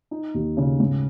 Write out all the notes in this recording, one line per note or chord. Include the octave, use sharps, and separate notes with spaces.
D#4
D#2
C#3
G#2